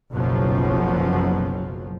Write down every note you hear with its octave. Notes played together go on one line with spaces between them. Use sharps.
F#1 B1 F#2 B2 F3 F#3